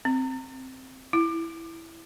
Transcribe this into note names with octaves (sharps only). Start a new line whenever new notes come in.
C4
E4